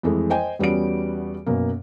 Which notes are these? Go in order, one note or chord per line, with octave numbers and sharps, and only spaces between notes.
F2 E3 G#3 A3
C5 D#5 G5 G#5
E2 G3 B3 C#4 F#4 D7
F#2 B2 A#3